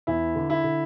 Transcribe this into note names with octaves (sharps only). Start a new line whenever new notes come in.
E2 E4
D3
E4
D3